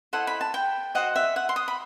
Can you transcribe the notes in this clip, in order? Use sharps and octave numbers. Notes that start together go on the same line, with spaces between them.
E4 A4 C5 D#5 F#5
B5
A5
G5
F#4 C5 D#5 F#5
E5
F#5
C6
D#6
B5